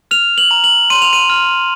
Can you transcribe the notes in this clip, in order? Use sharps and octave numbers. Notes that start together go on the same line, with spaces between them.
F6 F7
F#7
A#5
F#7
C6 D#7
F7
D#7
F6